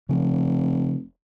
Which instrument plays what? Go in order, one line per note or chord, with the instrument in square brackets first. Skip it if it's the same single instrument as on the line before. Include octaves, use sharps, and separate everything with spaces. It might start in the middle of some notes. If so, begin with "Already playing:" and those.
[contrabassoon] F1 [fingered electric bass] C#3 F3